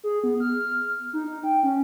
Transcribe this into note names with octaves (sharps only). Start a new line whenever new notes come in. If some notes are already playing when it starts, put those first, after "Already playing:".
G#4
B3
F6
D#4
D#4
G5
C#4